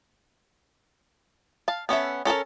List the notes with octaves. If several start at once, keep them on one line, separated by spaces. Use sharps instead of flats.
F5 A5
B3 C#4 A4 E5
C#4 A4 A#4 A5